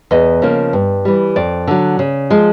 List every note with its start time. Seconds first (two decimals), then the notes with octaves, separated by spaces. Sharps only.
0.11 E2 D#5
0.42 C#3 F3 A#3
0.73 G2
1.05 E3 G3
1.36 F2 D5
1.67 D3 F#3
1.99 C#3
2.30 F3 G#3